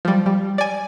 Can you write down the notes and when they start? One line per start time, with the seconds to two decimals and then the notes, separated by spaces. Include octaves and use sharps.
0.05 F3 G3
0.26 G3
0.58 D5 G#5